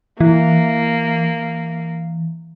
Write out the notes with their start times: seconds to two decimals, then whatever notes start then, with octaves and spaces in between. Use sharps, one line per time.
0.21 E3 A#3